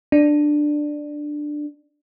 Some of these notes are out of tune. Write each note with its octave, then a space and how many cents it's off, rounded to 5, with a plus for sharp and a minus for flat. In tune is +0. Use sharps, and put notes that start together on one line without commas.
D4 +10